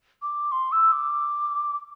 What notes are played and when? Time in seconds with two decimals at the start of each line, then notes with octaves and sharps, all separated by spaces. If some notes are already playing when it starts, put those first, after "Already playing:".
0.22 D6
0.52 C6
0.72 E6
0.92 D6